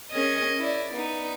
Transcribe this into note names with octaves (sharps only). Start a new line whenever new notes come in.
C#4 G#4 A#4 D#5 G#6
E4 D5
B3 D#4